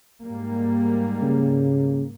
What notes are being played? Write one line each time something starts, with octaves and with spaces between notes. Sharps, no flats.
G#2 G3 A#3
C#3